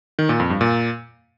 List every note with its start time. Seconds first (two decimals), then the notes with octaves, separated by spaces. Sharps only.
0.19 D#3
0.29 A#2
0.40 F2
0.50 G2
0.61 A#2